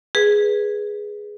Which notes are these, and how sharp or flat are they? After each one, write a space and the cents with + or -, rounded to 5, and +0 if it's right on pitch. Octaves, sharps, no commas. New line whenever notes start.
G#4 +0 B4 -10